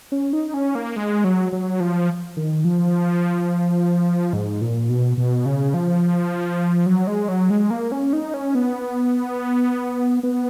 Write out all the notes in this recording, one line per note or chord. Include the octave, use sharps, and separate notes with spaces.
C#4
D#4
C#4
A#3
G#3
F#3
F#3
F3
D#3
F3
G#2
A#2
B2
B2
C#3
F3
F#3
G#3
F#3
G#3
A#3
C#4
D#4
C#4
B3
B3